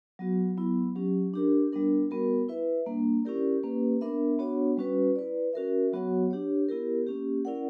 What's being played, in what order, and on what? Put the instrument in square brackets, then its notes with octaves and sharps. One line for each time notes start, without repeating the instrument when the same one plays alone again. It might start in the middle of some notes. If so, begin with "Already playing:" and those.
[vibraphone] F#3 B3 F#4
F#3 B3 E4
F#3 C#4 G4
D4 G4 A#4
G3 B3 D4 A#4
G3 B3 F#4 A#4
E4 B4 E5
G3 A#3 D4
C#4 E4 G4 A#4 D5
A#3 C#4 G4 B4
B3 D4 A#4 E5
B3 D4 F#4 C#5 F#5
G3 C#4 F#4 B4
E4 B4 D5
C#4 F#4 A#4 E5
F#3 B3 F#4 C#5 F#5
D4 G4 C#5
B3 E4 G4 A#4
A#3 C#4 G4
C#4 E4 A#4 D5 F#5